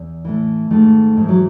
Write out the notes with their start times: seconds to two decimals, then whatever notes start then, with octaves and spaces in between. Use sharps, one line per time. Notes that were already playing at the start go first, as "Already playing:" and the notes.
Already playing: E2
0.25 A2 E3
0.70 G#2 D#3 A3
1.17 G#2 E3
1.28 F#3